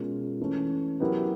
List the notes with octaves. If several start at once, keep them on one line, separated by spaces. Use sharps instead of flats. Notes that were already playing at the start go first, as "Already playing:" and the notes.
Already playing: B2 G#3 C#4 F4 A#4
E3 A3 C#4
F#3 B3 E4 G4 A#4